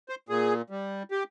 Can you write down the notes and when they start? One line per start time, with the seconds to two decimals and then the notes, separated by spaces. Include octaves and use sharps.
0.09 C5
0.29 A#2 G#4
0.70 G3
1.11 G4